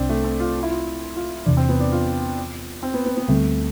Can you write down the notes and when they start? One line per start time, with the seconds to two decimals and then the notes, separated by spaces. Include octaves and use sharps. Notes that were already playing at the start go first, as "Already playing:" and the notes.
Already playing: C2 C3 C4 D4
0.09 A3
0.24 C4
0.40 F4
0.56 F4
0.63 E4
0.70 F4
1.16 F4
1.46 E2 C3 E3 D4
1.57 C4
1.69 B3
1.80 D4
1.92 F4
2.83 C4
2.94 B3
3.06 B3
3.17 B3
3.28 D2 D3 G3 A3 C4